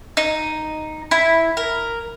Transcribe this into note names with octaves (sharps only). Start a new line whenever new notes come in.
D#4
E4
A#4